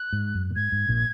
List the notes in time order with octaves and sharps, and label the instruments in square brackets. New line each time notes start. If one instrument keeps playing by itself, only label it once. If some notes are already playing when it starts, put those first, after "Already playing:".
Already playing: [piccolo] F#6
[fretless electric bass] G#2
F#2
A#2
[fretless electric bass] G#2 [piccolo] G#6
[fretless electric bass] G#2
A#1 A#2